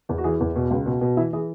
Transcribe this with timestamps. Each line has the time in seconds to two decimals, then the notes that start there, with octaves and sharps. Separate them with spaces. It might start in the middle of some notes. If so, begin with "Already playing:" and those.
0.09 E2
0.18 F#4
0.24 E3 G#4
0.40 E2
0.56 B2
0.71 C#2
0.86 B2
1.01 B2
1.17 E3 E4
1.33 E3 G#4